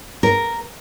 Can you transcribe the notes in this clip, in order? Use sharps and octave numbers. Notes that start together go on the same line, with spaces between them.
A#4